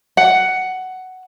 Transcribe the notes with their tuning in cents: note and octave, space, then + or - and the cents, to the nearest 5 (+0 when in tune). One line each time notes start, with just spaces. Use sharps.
F#5 +10